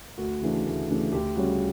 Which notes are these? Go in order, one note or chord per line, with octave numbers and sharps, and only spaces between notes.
D2 F#4
C#3 E3 A3 D4
D2
C#3 E3 A3 D4
D2 G4
C#3 G3 C#4 F#4